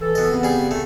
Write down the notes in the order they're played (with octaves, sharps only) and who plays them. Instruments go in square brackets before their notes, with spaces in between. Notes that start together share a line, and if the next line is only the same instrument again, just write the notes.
[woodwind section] E3 A4
[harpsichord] B2 D#5
[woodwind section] C#3 B3 C4
[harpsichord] G3 G#4
A3